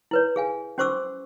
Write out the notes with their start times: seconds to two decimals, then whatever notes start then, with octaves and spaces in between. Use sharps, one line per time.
0.11 E4 B4 C#5
0.36 G#4 F5 G#5
0.78 C#4 F#4 C5 C#6 D6 E6